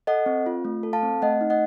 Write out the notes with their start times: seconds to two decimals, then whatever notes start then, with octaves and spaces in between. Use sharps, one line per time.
0.07 A4 D#5 F#5
0.26 C4
0.46 F4
0.65 A3
0.83 A4
0.93 F5 A5
1.03 C4
1.22 A3 D#5 F#5
1.41 D#4
1.50 D#5 F#5